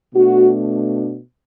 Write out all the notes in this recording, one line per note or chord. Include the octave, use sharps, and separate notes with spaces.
B2 A3 D4 F#4